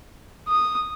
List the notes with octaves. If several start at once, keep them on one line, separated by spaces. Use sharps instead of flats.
D#6